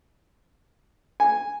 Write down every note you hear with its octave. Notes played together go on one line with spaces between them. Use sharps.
G#5